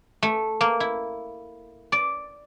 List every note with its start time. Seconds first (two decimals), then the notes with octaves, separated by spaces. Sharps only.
0.23 A3
0.61 A#3
0.80 E4
1.92 D5